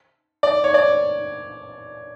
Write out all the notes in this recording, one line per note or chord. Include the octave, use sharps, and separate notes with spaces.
D5
C#5
D5